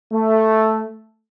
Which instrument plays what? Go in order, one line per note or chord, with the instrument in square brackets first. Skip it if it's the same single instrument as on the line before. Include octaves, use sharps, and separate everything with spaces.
[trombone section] A3